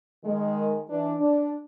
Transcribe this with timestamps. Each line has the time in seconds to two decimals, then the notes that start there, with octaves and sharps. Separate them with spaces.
0.24 D#3 G#3
0.89 E3 D4
1.20 D4